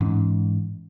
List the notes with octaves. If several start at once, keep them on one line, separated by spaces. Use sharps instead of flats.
G#2 E3 C#4